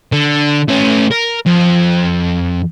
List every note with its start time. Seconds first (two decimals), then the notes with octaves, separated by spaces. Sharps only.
0.12 D3
0.68 A3 C#4
1.11 A#4
1.46 F2